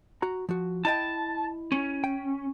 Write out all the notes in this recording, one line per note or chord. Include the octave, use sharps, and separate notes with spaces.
F#4 A#5
F3 F#4
E4 D#5 G5 A5
C#4
G5